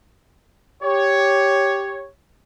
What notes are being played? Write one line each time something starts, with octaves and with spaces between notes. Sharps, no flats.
G4 C#5